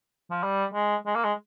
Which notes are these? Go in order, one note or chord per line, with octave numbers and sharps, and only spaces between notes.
F3
G3
G#3
G#3
A#3
G#3